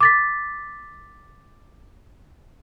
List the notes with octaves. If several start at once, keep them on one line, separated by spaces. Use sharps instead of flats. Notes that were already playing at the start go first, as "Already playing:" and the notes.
D6 A6 B6